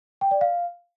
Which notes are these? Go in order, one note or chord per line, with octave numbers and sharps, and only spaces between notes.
G5
D5
F5